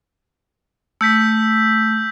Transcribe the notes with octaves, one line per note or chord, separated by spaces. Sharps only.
A3 E6 G6 B6